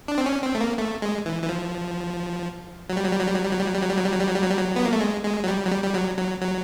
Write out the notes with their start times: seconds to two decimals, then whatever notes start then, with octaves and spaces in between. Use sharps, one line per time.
0.08 D4
0.18 C4
0.26 C#4
0.43 C4
0.55 A3
0.61 A#3
0.78 A3
1.02 G#3
1.26 E3
1.43 E3
1.49 F3
2.90 F#3
2.97 G3
3.05 F#3
3.13 G3
3.20 F#3
3.28 G3
3.36 F#3
3.43 G3
3.51 F#3
3.59 G3
3.66 F#3
3.75 G3
3.82 F#3
3.90 G3
3.97 F#3
4.05 G3
4.13 F#3
4.21 G3
4.28 F#3
4.36 G3
4.43 F#3
4.51 G3
4.59 F#3
4.76 B3
4.85 A#3
4.92 A3
5.01 G#3
5.24 G#3
5.44 F#3
5.48 G3
5.65 F#3
5.72 G3
5.84 G3
5.95 F#3
6.18 F#3
6.41 F#3